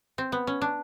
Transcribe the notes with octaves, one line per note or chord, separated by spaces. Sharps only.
C4
B3
C#4
D4